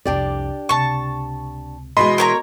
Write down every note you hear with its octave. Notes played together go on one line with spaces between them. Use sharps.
C2 F2 D4 G4 D5
C#2 C3 A5 C#6
B2 E3 G#3 D#5 B5 C6
A#4 C#5 A#5